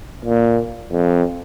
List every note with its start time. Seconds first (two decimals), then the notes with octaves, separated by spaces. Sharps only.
0.25 A#2
0.92 F2